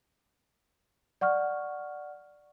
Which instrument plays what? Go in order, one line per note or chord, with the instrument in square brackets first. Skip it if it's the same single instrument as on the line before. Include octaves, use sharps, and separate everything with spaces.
[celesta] D5 F#5 C#6 F6